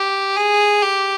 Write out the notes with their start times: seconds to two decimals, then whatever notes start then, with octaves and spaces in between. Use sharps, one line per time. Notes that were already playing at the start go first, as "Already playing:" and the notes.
Already playing: G4
0.37 G#4
0.82 G4